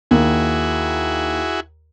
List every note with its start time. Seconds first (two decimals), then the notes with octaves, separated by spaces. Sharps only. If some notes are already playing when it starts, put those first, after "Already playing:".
0.11 D#2 E4 F#4 G#4